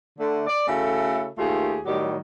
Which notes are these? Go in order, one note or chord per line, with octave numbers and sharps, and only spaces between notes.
D3 A3
D5
C#3 A3 E4 F#4 A4
D#2 A3 F4 G4 G#4
A2 D#3 F#3 G3 G4